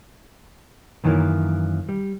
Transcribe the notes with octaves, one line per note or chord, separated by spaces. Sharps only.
F#2 D#3 E3 F#3 A#3 E4
G3